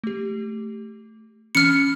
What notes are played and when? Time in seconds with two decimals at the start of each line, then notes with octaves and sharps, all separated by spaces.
0.04 A3 G4
1.55 E3 C#4 B5 F6 C#7